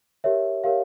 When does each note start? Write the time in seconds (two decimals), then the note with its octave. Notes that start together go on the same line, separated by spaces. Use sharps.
0.24 G4 A#4 C#5 E5
0.64 G4 A#4 C#5 F5